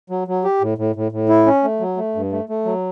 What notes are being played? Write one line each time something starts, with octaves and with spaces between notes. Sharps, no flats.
F#3
F#3
G4
A2
A2
A2
A2
E4
C#4
A3
F#3
A3
G2
A3
A3
F#3